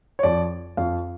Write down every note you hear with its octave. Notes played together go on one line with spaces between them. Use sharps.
C#5
F2 F3 D5
F2 F3 F5